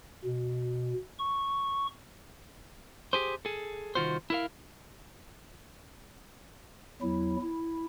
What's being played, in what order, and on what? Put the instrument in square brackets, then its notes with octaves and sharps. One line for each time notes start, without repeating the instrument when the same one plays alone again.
[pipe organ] B2
C#6
[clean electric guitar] G4 G#4 C5
G#4 A4
C2 D#3 F4 F#4 C5
E4 A#4 F5
[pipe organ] E2 F#3 E4
E4